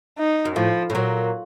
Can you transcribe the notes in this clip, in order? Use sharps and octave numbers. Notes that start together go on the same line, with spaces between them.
D#4
F#2
A2 F3
A2
A#2 F#3